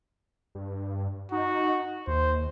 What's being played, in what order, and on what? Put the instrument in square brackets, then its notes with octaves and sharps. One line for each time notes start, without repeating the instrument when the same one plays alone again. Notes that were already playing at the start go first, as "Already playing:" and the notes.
[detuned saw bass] G2
[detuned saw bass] D#4 [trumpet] F#4
[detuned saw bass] D#2 [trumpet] C5